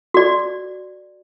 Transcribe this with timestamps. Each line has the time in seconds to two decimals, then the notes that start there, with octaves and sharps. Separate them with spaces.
0.14 F#4 D5